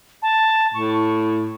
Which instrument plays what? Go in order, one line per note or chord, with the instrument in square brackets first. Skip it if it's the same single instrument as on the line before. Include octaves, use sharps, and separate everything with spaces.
[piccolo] A5
[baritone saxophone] A2 [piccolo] C#6